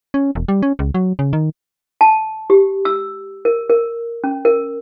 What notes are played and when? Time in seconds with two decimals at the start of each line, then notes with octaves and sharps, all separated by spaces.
0.14 C#4
0.35 E1
0.48 G3
0.63 C#4
0.79 C#2
0.94 F#3
1.19 C#3
1.33 D#3
2.01 A5
2.50 G4
2.85 E6
3.45 A#4
3.70 A#4
4.24 C#4
4.45 A#4